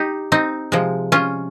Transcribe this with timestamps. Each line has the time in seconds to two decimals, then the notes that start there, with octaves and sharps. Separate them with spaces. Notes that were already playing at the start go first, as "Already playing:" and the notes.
Already playing: D#4 G4
0.32 C4 D#4
0.72 C3 F3 G#3
1.12 C#4 F4